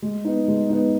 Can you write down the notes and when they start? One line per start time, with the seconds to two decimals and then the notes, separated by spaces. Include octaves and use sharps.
0.02 G#3
0.25 B3 D#4
0.48 G#3
0.69 B3 D#4